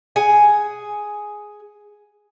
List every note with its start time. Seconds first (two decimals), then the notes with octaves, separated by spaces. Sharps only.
0.16 G#4 F#5 G#5